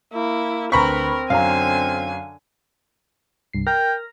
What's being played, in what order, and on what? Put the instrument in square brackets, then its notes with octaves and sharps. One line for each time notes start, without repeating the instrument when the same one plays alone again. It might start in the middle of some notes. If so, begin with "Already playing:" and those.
[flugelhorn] A#3 [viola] E4
[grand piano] D2 B4 B6 [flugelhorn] C4 [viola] A#4 [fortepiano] A#5 B5 C#6
[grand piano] F#2 F#3 A#5 [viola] D3 G#5 [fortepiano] F5
[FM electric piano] C2 G2 C7
[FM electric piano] A#4 F6 A#6 [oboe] G5